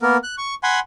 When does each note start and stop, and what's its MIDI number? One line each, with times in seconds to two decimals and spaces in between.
0.02 0.17 58
0.02 0.17 59
0.02 0.17 70
0.23 0.35 90
0.38 0.54 85
0.63 0.80 78
0.63 0.80 80
0.63 0.80 83
0.63 0.80 84